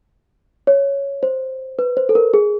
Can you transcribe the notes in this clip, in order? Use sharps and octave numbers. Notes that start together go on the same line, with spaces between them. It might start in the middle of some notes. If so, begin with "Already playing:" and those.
C#5
C5
B4
C5
A4
A#4
G#4